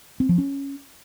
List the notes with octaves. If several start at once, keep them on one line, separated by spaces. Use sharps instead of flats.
C4
F3
C#4